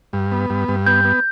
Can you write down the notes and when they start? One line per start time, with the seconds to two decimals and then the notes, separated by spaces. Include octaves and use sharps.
0.13 G2
0.32 B3
0.50 G2
0.68 G2
0.86 B3 G6
1.05 B3